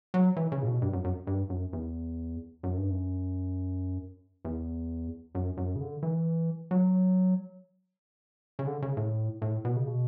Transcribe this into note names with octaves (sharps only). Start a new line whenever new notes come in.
F#3
E3
C#3
A2
B2
G2
F#2
F#2
G2
F#2
E2
F#2
G2
F#2
E2
F#2
F#2
C#3
D3
E3
F#3
C#3
D3
C#3
A2
A2
B2
C#3
B2